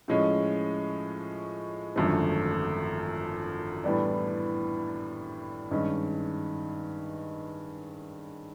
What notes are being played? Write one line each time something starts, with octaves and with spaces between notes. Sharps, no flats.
A2 F3 G#3 C#4
G#1 F#2 D3 F3 A3
A2 E3 G3 B3 D4
G2 D#3 G#3 C#4